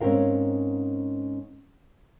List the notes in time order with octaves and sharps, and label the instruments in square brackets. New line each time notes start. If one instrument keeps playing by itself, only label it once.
[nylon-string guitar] G#2 C4 C#4 G4 A#4 F5